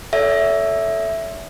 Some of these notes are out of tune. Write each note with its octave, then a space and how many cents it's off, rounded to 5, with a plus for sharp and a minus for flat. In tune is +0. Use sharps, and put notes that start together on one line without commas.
A4 -5 C#5 +40 E5 +0